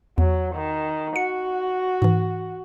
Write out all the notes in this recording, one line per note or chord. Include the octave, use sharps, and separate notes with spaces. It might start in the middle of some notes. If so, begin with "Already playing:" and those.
E2 F#3
D#3
F#4 C#7
G#2 E3